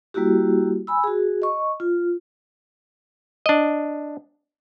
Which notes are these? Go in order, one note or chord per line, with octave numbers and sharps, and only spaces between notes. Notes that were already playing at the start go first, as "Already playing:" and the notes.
G3 A#3 E4 F#4 G4
G#5 B5 E6
F#4 G#4
D#5 C#6
F4
D4 D#5